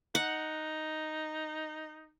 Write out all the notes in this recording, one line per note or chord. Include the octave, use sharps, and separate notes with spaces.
D#4 F#5